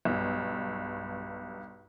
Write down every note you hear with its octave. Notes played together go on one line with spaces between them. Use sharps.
B1 G2